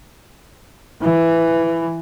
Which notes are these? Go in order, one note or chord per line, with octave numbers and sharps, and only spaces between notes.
E3